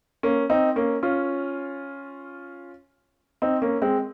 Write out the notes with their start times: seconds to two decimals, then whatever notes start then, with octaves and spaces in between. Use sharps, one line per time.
0.23 A#3 C#4
0.50 C4 D#4
0.76 A#3 C#4
1.03 C#4 F4
3.42 C4 D#4
3.62 A#3 C#4
3.82 G#3 C4